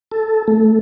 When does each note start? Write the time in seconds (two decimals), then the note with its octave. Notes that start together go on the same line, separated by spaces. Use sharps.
0.12 A4
0.48 A3